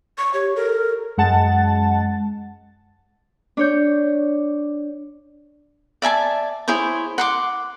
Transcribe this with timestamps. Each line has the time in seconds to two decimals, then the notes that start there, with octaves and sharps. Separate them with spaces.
0.18 C#6
0.34 G4 C#5
0.56 A4 A#4
1.17 F#2 G#3 F#5 A5 A6
3.57 D4 C#5 G6
6.02 D5 E5 G#5 A5
6.68 E4 G#4 C5 C#5
7.18 F#5 C6 D6